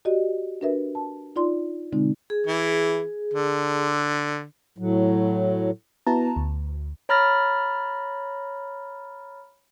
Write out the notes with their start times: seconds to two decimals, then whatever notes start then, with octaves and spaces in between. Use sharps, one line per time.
0.05 F#4 G4 D5 D#5
0.61 D4 F#4 A#4 B4 E5
0.95 A5
1.36 D#4 F4 D5 C6
1.92 B2 D3 G#3 C4 D#4
2.30 G#4
2.47 E3
3.34 D3
4.78 A2 F#3
6.06 B3 E4 F#4 B4 A5 A#5
6.36 D2
7.09 C#5 A#5 B5 F6 A6 A#6